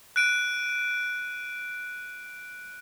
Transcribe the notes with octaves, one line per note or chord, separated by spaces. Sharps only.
F#6 D7 D#7